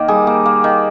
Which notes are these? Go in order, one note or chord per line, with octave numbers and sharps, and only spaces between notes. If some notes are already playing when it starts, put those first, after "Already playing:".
Already playing: D#3 A#3
G3 G#4
A#3
A#3
D#3